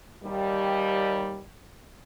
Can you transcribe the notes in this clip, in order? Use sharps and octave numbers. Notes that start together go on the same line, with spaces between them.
D#2 G3